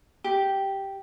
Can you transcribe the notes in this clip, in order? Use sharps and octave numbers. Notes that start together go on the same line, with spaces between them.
G4